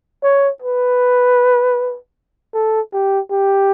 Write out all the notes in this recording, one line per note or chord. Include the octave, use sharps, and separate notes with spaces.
C#5
B4
A4
G4
G4